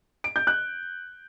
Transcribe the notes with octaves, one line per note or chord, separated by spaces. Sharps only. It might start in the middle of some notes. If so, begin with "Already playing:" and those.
D7
G6
F#6